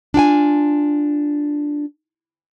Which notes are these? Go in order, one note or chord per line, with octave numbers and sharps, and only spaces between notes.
D4 F4 G5 G#5